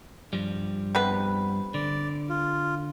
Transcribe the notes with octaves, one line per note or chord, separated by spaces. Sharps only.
G2 F3 G3
C3 B3 B4
D3 D5
F4